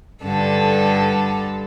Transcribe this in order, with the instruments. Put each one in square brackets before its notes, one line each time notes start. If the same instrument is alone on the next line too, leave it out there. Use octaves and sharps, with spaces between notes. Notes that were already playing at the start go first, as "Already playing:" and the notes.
[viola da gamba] G2 D3 A4